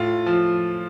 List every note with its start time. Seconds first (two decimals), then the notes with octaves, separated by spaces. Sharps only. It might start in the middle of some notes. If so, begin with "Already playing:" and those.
Already playing: A2 F4
0.26 F3